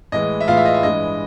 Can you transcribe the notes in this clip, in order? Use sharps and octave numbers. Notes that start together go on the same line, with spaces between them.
A2 E3 G#3 D#5
E5
A2 E3 G#3 F4 F5
E5
D#5
E5
G2 E3 G#3 D#5